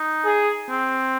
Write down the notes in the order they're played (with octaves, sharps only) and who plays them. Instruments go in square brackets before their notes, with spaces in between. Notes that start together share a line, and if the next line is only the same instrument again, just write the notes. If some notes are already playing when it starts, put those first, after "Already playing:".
Already playing: [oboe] D#4
[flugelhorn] G#4
[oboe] C4